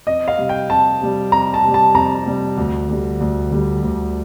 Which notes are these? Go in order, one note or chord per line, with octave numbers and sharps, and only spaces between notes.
F2 D#5
F5
C3 G3
G5
F2 A5
C3 G3
F2 A#5
A5
C3 G3
A5
F2 A#5
C3 G3
D2
D3 G3
D2
D3 G3
D2